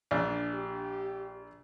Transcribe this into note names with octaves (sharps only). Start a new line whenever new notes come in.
A#1 D4
G4